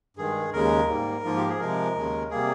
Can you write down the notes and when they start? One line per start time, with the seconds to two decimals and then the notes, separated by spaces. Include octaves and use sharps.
0.17 G2 D#3 G#3 G#4
0.52 D#2 C#3 G#3 A#4
0.88 G#2 G3 A#3
1.24 G#2 F3 A#3 F4
1.37 G4
1.49 G#4
1.59 C3 F3 G#3 A#4
1.95 D#2 C#3 G#3
2.31 C3 G3 A#3 G#4